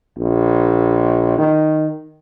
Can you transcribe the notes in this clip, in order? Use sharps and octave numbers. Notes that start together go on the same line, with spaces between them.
A#1
D#3